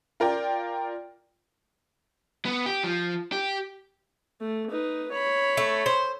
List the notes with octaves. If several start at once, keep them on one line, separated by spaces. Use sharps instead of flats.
F4 A#4 D5 G5
B3
G4
F3
G4
A3
D#4 B4
C#5 B5
A3
C5